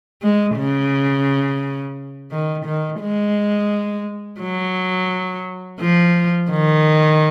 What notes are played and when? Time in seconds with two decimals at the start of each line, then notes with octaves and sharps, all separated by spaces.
0.22 G#3
0.56 C#3
2.31 D#3
2.65 D#3
3.01 G#3
4.41 F#3
5.80 F3
6.51 D#3